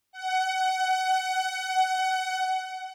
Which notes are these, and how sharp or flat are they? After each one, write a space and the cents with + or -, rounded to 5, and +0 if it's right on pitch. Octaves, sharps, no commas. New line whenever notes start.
F#5 +25